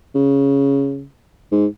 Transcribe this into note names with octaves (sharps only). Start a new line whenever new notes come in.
C#3
G#2